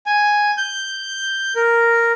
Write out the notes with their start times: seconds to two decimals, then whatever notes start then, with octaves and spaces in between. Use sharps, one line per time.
0.06 G#5
0.57 G6
1.56 A#4